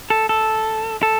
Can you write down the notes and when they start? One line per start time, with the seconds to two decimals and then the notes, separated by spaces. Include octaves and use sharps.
0.10 A4
0.29 A4
1.03 A4